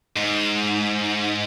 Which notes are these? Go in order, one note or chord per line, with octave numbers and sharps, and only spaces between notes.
G#2